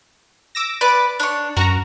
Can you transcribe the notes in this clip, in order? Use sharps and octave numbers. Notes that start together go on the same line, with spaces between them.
D6 E6 A#6
B4 D5 D6 A6
D4 C#5
F#2 F#4 A#4 A#5